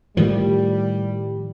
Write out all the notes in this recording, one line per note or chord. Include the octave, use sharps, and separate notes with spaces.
A2 D#3 F3 G3